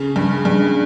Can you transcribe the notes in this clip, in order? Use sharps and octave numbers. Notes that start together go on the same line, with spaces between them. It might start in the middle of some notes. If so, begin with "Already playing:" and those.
Already playing: C#3
G2
G2